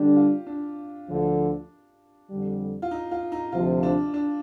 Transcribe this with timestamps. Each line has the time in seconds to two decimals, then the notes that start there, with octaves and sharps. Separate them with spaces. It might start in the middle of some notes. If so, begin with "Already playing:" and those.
Already playing: D3 G3 D4 G4
0.16 F4
0.47 D4
1.08 D2 D3 F3
2.30 F2 D3 G3
2.82 F4
2.91 D#4
3.11 F4
3.32 D#4
3.52 D2 C3 F3 F4
3.83 D4
4.14 D4